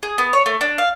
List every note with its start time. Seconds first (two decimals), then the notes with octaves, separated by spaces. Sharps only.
0.03 G#4
0.18 B3
0.33 C#5
0.46 A3
0.61 D4
0.78 F5